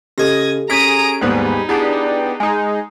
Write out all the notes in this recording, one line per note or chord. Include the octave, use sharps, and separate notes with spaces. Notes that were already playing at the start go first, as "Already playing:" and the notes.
C#3 G4 A4 D#5 D#6 G#6 A#6
C#4 G#4 A#5 D#6 B6 D7
D#2 G#2 G3 B3 D#4 G#4 B4
B3 D4 E4 G4 G#4
G#3 D#4 G#5